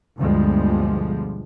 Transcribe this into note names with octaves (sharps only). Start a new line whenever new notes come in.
G1 D2 B2 F3 G3 G#3